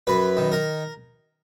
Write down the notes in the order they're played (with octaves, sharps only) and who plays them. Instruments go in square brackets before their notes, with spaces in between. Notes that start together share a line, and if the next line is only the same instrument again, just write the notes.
[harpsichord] F#2 B4
D#3
A#4